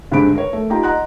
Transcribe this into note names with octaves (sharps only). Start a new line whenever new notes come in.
G2 D3 G#3 C4 B5 D7
A#4 B4 C#5
A3
A#3 D#4 F4 G4 G5 A#5
D#5 F#5 A#5 C6 F#6